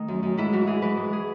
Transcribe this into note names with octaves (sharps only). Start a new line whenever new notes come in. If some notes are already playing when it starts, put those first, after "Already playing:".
Already playing: D#3 A3 D#4
F#2
F#2
G#2 E4
E3 F#4
E3 G#4
E3 B4
G#2
G#4